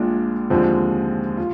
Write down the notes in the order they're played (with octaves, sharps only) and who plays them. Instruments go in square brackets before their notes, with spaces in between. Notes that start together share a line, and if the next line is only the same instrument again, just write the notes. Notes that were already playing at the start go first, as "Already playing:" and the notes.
Already playing: [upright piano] A#1 A#2 G#3 D4 F4
D#2 D3 F3 G#3 C4
F4